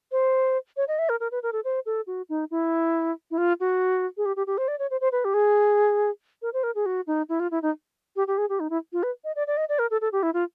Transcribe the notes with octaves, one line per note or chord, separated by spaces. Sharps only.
C5
C#5
D#5
E5
A#4
A#4
B4
A#4
A4
C5
A4
F#4
D#4
E4
E4
F4
F#4
G#4
G4
G4
G4
C5
D5
C#5
C5
C5
B4
G4
G#4
A#4
C5
A#4
G#4
F#4
D#4
E4
F4
E4
D#4
G4
G4
G#4
G4
D#4
E4
F4
B4
D#5
D5
D5
D#5
D5
A#4
A4
A4
G4
E4
F4